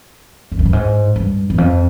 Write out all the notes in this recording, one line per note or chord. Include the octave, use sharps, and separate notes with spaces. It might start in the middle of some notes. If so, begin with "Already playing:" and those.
F2
F#2
G2
G#2
G2
E2
F2